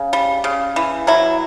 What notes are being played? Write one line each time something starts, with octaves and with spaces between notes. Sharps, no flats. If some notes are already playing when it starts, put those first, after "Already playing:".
Already playing: C#3
G3
C#3
E3
F#3 E4